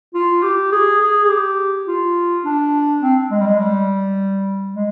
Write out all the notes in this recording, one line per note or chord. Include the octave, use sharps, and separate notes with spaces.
F4
G4
G#4
G#4
G#4
G4
F4
D4
C4
G#3
G3
G#3
G3
G#3